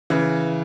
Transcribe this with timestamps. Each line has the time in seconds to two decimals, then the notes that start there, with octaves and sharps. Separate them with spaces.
0.10 C#3 E3